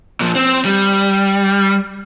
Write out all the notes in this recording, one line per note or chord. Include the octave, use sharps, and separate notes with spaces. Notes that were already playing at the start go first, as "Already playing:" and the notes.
A#2 F3
C4
G3